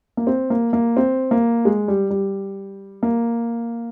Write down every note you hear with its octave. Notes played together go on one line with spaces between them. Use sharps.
A#3
C4
A#3
A#3
C4
A#3
G#3
G3
G3
A#3